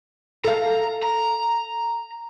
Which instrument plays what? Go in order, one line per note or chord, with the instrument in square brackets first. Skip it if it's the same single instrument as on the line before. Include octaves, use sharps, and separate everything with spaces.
[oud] A4 F5 [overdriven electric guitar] A#5
[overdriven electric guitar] A#5